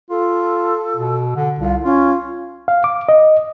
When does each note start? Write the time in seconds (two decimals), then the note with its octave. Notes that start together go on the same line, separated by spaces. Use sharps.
0.10 F4 A4
0.97 B2
1.35 D3
1.59 C2 F4
1.84 C#4 F4
2.68 F5
2.84 D6
3.09 D#5